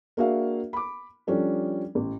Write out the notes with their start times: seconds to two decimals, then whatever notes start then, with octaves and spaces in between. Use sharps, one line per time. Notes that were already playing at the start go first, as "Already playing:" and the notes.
0.17 A#3 D4 F#4 G#4 E5 F5
0.73 B5 D6
1.27 F3 G3 C#4 D4 A4
1.95 A1